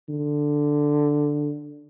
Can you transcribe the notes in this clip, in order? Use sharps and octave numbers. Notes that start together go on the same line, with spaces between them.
D3